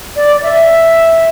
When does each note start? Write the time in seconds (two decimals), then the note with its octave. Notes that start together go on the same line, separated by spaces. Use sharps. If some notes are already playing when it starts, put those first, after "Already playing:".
0.16 D5
0.36 D5
0.43 E5